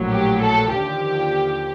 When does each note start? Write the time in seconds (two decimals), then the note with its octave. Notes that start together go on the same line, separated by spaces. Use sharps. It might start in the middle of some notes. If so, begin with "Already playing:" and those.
Already playing: A#1 A2 F#3
0.10 G4
0.41 A4
0.71 D#2 D3 F3 G4